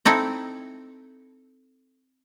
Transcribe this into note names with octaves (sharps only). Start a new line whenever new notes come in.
C4 D#4 E4 A4